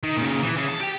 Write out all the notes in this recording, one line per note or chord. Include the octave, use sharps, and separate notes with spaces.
D#3
A#2 C#3
E3
C#3
A5
G4 G5